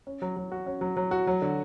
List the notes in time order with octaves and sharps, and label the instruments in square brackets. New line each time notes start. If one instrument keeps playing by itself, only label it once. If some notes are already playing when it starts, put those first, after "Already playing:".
[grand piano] C#4
F#3
F#3
F#4
C#4
F#3
F#3
F#4
F#3
D3